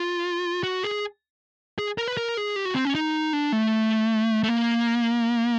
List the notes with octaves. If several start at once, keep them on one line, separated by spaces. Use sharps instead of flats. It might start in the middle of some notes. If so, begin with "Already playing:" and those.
Already playing: F4
F#4
G#4
G#4
A#4
B4
A#4
G#4
G4
F#4
C4
C#4
D#4
D4
A3
A3
A#3